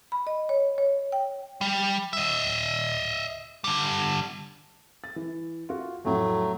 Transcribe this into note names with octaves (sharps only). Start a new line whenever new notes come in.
B5
D#5
C#5
C#5
G5
G3
D#5 E5
D3 G3
A6
E3
F4 F#4
F2 A2 F#3 A3